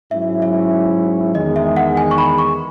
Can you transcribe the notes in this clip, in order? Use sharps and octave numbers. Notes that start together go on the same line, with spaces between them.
G#2 F#3 C#4 E4 E5
E5
E2 D#3 G#3 D#5
E5
F#5
G#5
C#6
B5
C#6